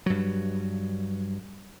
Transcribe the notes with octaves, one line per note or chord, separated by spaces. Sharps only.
G2 F#3